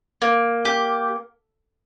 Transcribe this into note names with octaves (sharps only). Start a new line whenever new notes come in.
A#3
G4